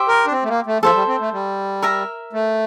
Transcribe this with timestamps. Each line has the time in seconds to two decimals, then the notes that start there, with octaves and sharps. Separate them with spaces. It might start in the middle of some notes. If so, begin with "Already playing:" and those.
Already playing: G4 C5 E5
0.08 A#4
0.27 D4
0.32 C4
0.43 A3
0.49 A#3
0.66 A3
0.83 F3 A4 C5 E5
0.95 G3
1.07 C4
1.21 A3
1.33 G3
1.82 A#4 E5 A#5
2.33 A3